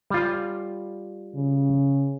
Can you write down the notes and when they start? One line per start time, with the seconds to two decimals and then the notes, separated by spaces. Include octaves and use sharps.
0.10 G3 F4
1.35 C#3